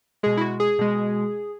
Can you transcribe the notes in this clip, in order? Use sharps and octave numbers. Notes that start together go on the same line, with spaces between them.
B2 G#3 G#4
E4
F#4
G#4
B2 G#3